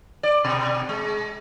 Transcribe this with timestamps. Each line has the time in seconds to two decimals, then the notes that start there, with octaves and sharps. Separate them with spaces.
0.23 D5
0.45 B2
0.89 G#3